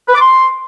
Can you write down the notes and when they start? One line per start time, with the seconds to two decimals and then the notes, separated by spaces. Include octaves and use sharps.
0.08 B4
0.14 D6
0.21 C6